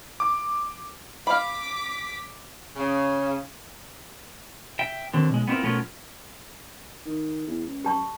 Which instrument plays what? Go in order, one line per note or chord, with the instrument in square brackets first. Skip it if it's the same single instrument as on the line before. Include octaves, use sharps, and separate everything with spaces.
[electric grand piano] D6
[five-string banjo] F5 B5 [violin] D6 B6
[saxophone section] C#3
[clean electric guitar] E5 G5
D3 D#3 F#3 C4
B1 G#3
B3 C4 D4 E4 F4 A#4
B1 A3 B3 C#4 F4 A#4
[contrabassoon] D#3
E2
C#2
[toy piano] G4 A5 C#6